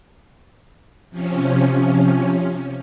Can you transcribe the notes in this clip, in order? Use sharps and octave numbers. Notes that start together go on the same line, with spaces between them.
C3 F3 C#4